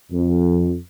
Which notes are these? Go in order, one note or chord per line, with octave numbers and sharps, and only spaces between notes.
F2